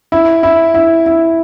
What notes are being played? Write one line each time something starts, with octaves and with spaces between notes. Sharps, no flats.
E4
E4
E4
E4